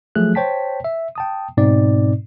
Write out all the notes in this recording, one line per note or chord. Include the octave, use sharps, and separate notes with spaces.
F3 F#3 A3 G#4 F#6
C5 C#5 G5 A5 B6
E5
G5 A5 D#6
G#2 B2 C4 D#4 D5